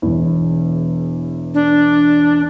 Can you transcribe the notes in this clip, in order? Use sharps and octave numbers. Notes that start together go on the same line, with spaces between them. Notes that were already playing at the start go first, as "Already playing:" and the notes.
E1 E2
D4